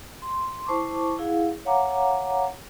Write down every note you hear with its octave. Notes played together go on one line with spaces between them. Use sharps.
C6
E4 C5 A5 C#6 D6
E4 G#4 F5 F#5
C#5 F5 F#5 A#5 D6